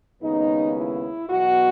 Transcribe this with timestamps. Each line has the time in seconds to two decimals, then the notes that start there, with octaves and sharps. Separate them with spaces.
0.21 D#2 C#3 G#3 B3 D#4
0.75 E4
1.29 E2 B2 F#3 F#4